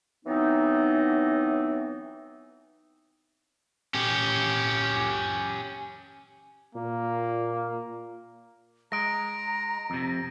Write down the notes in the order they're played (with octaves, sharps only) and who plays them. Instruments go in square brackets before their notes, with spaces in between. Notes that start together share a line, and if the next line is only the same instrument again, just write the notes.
[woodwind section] E3 F#3 B3 C4 D#4
[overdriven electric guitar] C#4 G4
[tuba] A#2 [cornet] A#3
[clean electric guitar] G#3 [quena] A#5 [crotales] A#6 D7
[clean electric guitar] F2 C3